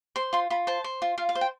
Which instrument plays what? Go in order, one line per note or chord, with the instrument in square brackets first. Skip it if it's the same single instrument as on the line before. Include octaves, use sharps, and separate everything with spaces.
[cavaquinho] C5 C6
F4 C6
F4 B5
C5 A5
C5
F4
F4 F5
F5
C5
G5